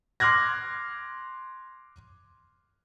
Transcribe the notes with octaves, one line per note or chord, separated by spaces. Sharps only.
C6 D6 F6 F#6 G#6 A#6